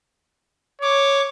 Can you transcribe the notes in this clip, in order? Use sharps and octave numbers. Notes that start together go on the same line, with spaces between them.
C#5 D6